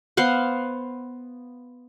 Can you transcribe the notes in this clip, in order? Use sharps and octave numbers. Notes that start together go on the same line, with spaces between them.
B3 C5 F5 F#5